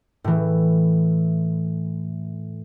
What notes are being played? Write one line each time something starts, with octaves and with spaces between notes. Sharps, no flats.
A2 E3